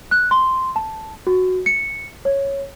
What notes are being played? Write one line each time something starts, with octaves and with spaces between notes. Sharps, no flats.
F#6
C6
A5
F#4
C#7
C#5